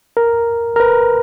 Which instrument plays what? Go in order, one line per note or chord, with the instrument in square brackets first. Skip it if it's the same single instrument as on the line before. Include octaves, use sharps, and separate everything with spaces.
[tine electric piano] A#4
A#4
B4